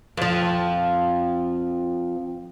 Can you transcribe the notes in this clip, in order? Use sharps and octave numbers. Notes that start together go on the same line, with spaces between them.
F2 F3